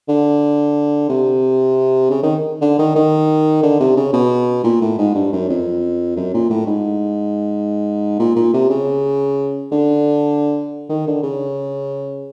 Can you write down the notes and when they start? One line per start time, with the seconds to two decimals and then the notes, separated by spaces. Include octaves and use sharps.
0.08 D3
1.09 C3
2.10 C#3
2.23 D#3
2.61 D3
2.78 D#3
2.95 D#3
3.63 D3
3.80 C3
3.97 C#3
4.13 B2
4.64 A#2
4.81 A2
4.98 G#2
5.14 G2
5.32 F#2
5.49 F2
6.16 F#2
6.34 A#2
6.50 A2
6.66 G#2
8.19 A#2
8.36 A#2
8.54 C3
8.69 C#3
9.71 D3
10.89 D#3
11.07 D3
11.23 C#3